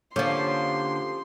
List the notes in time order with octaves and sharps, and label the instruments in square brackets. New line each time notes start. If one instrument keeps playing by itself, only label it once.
[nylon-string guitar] D3 A#3 D5 [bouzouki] F3 G4 [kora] C#4 [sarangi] C6